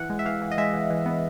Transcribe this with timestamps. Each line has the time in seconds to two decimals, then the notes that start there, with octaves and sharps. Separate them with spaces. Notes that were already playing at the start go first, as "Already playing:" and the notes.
Already playing: E3 F#5
0.10 G#3
0.19 E5
0.25 E3 F5
0.42 E3
0.51 D#5
0.58 G#3 E5
0.73 E3
0.90 E3
1.06 B3